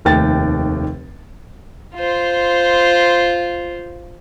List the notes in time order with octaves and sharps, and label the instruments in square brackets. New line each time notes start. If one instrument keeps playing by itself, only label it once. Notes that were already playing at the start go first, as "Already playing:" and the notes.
[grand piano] F1 D#2 A3 G5 A6
[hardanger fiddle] F4 C5